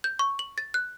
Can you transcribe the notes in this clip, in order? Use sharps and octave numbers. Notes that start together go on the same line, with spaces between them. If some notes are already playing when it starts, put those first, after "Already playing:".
G6
C#6
F#7
A6
F#6